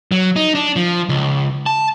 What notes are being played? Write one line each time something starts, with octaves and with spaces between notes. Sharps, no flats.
F#3
D#4
D4
F3
C#2
A5